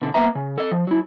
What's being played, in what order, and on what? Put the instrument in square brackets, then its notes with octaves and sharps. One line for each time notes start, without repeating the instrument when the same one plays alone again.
[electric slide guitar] B2 D3
A#3 B3 B4 E5 A#5
C#3
A4 D#5
F3
F#3 E4